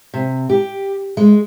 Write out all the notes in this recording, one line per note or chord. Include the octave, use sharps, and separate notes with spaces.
C3
G4
G#3